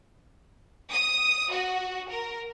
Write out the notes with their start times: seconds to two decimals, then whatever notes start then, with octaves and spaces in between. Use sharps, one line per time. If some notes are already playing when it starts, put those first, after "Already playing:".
0.92 D#6
1.52 F#4
2.10 A#4